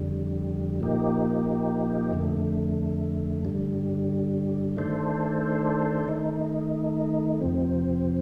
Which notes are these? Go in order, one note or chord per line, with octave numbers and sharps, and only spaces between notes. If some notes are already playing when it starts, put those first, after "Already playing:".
Already playing: F2 D3 G3
A#2 F3 A#3 D#4 G4
F2 D3 A3
G2 D3 G3
D#3 A3 D4 A4 C5
D#3 A3 D#4
F2 C3 F3 C4